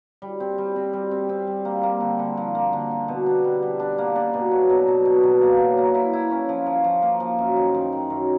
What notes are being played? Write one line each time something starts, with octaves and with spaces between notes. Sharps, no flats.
G3
C4
G3
C4
G3
C4
C4
G3
A#3
A#3
D3
D3
F3
A#3
D3
D3
B2
D4
G3
G3
D4
A#3
D4
B2
F#3
B2
B2
B2
B2
A#3
F#3
A#3
E4
E4
C#4
F3
F3
F3
A#3
F3
F#2
D#3
D#3
D#3
F#2